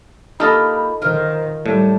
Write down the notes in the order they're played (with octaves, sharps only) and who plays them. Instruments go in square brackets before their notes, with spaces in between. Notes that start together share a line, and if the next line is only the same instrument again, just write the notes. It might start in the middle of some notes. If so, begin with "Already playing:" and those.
[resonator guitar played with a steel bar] A#3 F4 G4 [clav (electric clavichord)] D#4 A4 D#5 [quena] B5
[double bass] D#3 [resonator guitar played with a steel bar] F4 A#4 [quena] C5
[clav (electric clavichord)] A2 [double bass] G3 [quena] A5